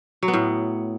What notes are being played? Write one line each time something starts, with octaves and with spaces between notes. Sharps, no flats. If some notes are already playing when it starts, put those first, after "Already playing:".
F#3
B3
A2